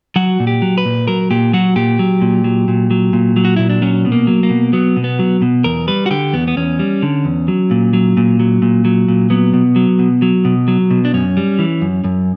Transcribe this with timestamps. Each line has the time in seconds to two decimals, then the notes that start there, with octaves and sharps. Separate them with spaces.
0.16 F#3 F#4
0.40 A#2
0.47 G4
0.62 F#3
0.78 B4
0.85 A#2
1.08 F#3 A#4
1.31 A#2 G4
1.53 F#3 F#4
1.76 A#2 G4
1.99 F#3
2.21 A#2
2.44 F#3
2.68 A#2
2.91 F#3
3.13 A#2
3.36 F#3
3.45 F#4
3.56 A#2 E4
3.70 D4
3.82 F#3 C#4
4.05 B2
4.12 A#3
4.27 F#3
4.43 A#3
4.50 B2
4.73 F#3 B3
4.97 B2
5.04 B3
5.19 F#3
5.42 B2
5.64 E2 A#4
5.88 G3 B4
6.06 F#4
6.11 D3 G4
6.33 E2 B3
6.48 B3
6.57 E2 C#4
6.79 G3
7.02 D3
7.25 E2
7.48 F#3
7.71 A#2
7.93 F#3
8.17 A#2
8.40 F#3
8.62 A#2
8.85 F#3
9.08 A#2
9.30 F#3 B3
9.54 B2
9.76 F#3
9.99 B2
10.22 F#3
10.45 B2
10.68 F#3
10.91 B2
11.05 D4
11.14 F#2 C#4
11.37 G3
11.59 E3
11.81 F#2
12.04 F#2